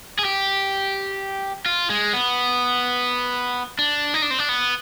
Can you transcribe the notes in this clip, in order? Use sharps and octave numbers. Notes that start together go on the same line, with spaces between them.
G#4
G4
F4
G#3
B3
D4
D#4
D4
C4
D4
B3